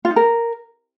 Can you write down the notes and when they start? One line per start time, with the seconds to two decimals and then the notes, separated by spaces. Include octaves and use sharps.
0.05 F4
0.11 D#4
0.16 A#4